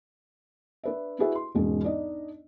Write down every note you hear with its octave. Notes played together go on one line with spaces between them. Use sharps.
D4 B4 E5
D4 E4 F#4 G#4 B4 E5
C6
E1 E2 G#2 G#3 C#4
D4 D#4 D5 D#5